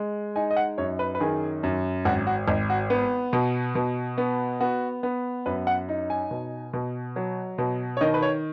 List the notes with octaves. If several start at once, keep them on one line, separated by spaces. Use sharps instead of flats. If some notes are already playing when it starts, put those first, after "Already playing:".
Already playing: G#3
D#4 G#5
D#5
F#5
F#2 C#5
B4
B4
D#3 G#4
F#2
G#1 F#4
F#4
G#1 D#4
F#4
B3
B2
B2
B3
B3 F#4
B3
F#2 B4
F#5
D#4
G#5
B2
B2
F#3
B2
C#5
D#3 D#5
B4
C#5